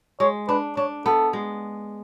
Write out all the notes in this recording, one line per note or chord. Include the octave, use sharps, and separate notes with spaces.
G#3 C#5
D4 B4
D4 C#5
B3 A4
G#3